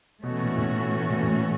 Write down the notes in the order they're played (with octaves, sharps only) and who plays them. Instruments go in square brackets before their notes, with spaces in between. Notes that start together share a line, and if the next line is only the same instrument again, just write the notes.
[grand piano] B2 [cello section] E3 A3 C#4 F#4
[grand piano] A#2
A2
A#2
A#2
A2